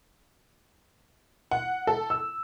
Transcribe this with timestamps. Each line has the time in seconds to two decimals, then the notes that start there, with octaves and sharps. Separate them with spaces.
1.51 F#5
1.87 A4
2.10 E6